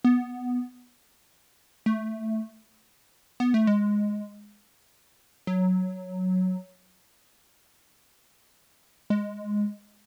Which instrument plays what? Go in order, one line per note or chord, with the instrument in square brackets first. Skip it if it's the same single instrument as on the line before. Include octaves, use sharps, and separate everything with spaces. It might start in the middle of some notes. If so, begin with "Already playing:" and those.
[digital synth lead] B3
A3
B3
A3
G#3
F#3
G#3